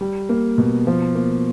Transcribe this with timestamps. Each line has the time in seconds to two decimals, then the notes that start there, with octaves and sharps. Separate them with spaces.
0.01 G3
0.29 A#3
0.58 B2
0.87 F3
1.15 A#3